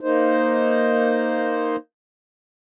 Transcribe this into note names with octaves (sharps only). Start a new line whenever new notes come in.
A#3 D#4 C5